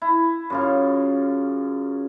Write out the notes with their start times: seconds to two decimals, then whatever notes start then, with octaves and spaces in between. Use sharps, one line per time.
0.02 E4
0.50 F#2 C#3 F4